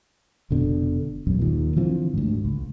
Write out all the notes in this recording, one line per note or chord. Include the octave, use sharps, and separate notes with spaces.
F1 B2 D3
E1 B1 F#2
D#2 A#2
D3 E3 F3 C4
D2 G#2
C#2